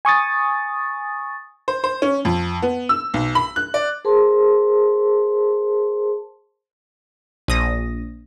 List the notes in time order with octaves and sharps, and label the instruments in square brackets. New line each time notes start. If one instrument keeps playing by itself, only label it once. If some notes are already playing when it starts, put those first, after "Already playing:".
[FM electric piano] G#5 C#6 D#6 A6
[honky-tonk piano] C5
C5
C#4
F2
B3
E6
B1
B5
F#6
D5
[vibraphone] G#4 A#4 C5 A5 C6
[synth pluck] A#1 D#6 A#6